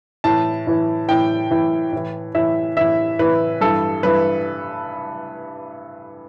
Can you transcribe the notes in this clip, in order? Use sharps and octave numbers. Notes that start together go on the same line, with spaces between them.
A2 E3 A5
A2 E3
A2 E3 G5
A2 E3
A2 E3
A2 E3 E5
A2 E3 E5
A2 E3 B4
G2 E3 A4
G2 E3 B4